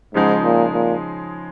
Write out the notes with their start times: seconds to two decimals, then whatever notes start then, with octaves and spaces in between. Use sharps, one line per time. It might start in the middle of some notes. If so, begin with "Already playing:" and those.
0.14 G#2 C#3 F3 G#3 D#4
0.44 A#2
0.73 A#2